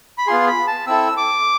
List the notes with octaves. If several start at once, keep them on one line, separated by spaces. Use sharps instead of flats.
B5
B3 F4 G#4 C6
B5
A5
C4 E4 A4 E6
D6